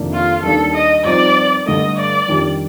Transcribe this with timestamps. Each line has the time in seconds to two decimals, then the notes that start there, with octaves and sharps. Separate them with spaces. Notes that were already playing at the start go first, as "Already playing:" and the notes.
Already playing: F2 C3 D#3 A#3 D4
0.13 F4
0.43 D#2 D#3 G3 D4 A4
0.74 D#5
1.04 G2 F3 C4 D#4 D5
1.66 G2 D3 A3 D#5
1.97 D5
2.28 F2 D#3 G3 D4 G4